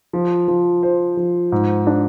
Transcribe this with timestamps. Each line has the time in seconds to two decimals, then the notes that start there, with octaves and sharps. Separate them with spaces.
0.13 F3
0.48 F3
0.83 C5
1.17 F3
1.52 G#2
1.87 D4